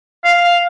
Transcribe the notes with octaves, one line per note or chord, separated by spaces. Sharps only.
F5